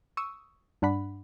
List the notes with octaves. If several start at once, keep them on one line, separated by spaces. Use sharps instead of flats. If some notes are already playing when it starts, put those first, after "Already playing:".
C#6 D#6 E6
G2 D4 F#5 B5